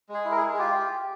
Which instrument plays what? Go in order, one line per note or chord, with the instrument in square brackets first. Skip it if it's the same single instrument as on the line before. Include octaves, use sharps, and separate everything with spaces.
[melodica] G#3
G#4
E4
A#4
G#4
G#3
G#4
F4 G4